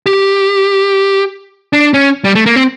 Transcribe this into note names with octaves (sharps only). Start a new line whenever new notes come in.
G4
D4
C#4
G3
A3
A#3
C4